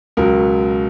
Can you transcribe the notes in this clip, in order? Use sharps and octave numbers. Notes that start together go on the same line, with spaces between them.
C#2 B2 F#3 A#4